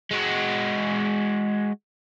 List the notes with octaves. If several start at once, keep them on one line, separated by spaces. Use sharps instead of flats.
G#3 F#4